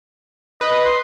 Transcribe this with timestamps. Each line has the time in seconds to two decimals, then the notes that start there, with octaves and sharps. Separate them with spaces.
0.61 B4 D#5
0.85 C6